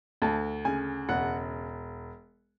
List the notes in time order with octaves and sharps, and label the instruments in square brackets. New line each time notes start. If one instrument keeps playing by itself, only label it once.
[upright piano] D2 A5
C#3 G#5
E1 F#5